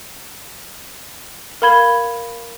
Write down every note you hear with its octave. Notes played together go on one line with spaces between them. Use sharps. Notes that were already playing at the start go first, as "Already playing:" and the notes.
A#4 F5 B5 G#6 G7